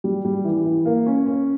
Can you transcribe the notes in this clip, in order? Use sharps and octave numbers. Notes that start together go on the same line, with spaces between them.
G3
G3
E3
E3
A#3
C#4
C#4